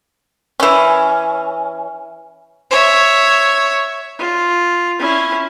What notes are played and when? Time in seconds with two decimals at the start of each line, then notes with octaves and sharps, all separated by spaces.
0.60 E3 C#4
2.71 C#5 E5
4.19 F4
4.99 C#4 E4